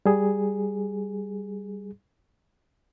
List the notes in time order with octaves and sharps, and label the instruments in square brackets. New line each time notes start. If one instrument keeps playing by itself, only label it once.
[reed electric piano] G3 G#4